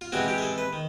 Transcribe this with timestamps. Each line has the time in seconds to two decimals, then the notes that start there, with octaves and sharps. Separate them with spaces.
0.01 F4
0.12 C3 E3 G#3 C4 F#4
0.28 G4
0.38 G#4
0.42 A4
0.58 B4
0.73 D#3